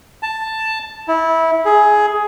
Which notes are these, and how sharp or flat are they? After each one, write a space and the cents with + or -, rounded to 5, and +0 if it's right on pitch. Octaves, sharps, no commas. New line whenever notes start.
A5 +5
E4 -20
G#4 +10